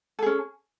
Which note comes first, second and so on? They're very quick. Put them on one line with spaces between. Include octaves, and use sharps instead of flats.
A4 G#4 C#4